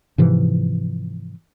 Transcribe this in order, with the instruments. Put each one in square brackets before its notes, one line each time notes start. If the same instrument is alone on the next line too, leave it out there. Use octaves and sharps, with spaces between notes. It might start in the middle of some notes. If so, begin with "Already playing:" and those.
[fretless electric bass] G#2 C3 E3 F3